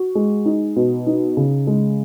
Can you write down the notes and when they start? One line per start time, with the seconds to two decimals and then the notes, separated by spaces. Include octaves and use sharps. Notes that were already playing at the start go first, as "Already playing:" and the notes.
Already playing: F#4
0.15 G#3
0.46 D#4
0.76 B2
1.07 D#4
1.37 C#3
1.67 G#3